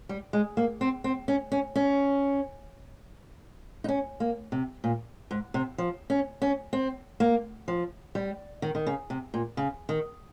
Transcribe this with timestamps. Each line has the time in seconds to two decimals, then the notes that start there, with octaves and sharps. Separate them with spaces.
0.09 G3
0.33 G#3
0.57 A#3
0.81 C4
1.04 C4
1.28 C#4
1.52 C#4
1.76 C#4
3.84 D#4
3.88 C#4
4.20 A#3
4.52 C3
4.84 A#2
5.31 G#2
5.54 C3
5.78 F3
6.10 C#4
6.42 C#4
6.73 C4
7.20 A#3
7.68 F3
8.15 G3
8.62 D#3
8.75 D#3
8.86 C#3
9.10 C3
9.34 A#2
9.57 C#3
9.89 D#3